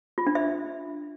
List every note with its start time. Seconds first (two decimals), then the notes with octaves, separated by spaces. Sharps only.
0.18 F4
0.27 D4
0.35 E5